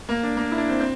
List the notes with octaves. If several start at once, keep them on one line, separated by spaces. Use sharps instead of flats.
A#3
D4
A#3
E4
D4
C4
C4